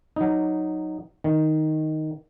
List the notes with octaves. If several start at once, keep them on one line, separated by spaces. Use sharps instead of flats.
F#3 D#4
D#3